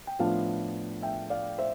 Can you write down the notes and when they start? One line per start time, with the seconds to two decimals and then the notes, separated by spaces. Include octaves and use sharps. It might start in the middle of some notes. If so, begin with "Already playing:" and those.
0.07 G5
0.19 A2 F3 B3 D4 F4 F5 A5
1.02 E5 G5
1.30 D5 F5
1.58 C5 E5